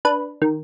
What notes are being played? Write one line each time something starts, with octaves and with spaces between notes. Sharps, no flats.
D4 B4
D#3